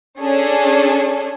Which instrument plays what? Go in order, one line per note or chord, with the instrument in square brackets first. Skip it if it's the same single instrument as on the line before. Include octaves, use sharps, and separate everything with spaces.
[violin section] C#4 D4 G#4 A4